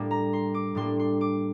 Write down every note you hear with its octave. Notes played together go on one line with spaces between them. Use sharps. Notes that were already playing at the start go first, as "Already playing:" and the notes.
Already playing: A2 G3 A#3 D4
A#5
C6
D6
A2 G3 A#3 D4 C6
C6
D6